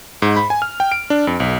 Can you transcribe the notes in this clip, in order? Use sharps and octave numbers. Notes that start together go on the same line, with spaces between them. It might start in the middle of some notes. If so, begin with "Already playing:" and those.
G#2
B5
G#5
F6
G5
D7
D4
F2
B1